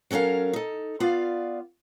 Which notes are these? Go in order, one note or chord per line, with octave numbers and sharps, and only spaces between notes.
F#3 C#4 A4 A#4 F5
D#4 A4
B3 F4 D5 F5